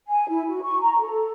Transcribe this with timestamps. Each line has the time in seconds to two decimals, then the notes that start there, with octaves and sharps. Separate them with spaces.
0.08 G#5
0.29 E4
0.48 F#4
0.62 C#6
0.81 A#5
1.00 A4